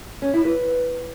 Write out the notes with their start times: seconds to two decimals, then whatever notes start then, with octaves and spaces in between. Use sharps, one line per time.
0.22 C#4
0.33 E4
0.45 B4